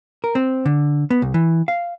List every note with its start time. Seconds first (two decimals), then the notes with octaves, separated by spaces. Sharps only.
0.24 A#4
0.35 C4
0.65 D3
1.10 B3
1.22 C2
1.34 E3
1.68 F5